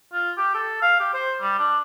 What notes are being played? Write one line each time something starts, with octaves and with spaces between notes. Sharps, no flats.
F4
G4
A4
F5
G4
C5
G3
D4